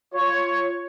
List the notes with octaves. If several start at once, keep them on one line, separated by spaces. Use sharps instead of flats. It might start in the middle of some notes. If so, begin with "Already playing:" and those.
F4 C#5